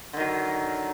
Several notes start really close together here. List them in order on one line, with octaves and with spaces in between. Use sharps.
D3 D#3 F#3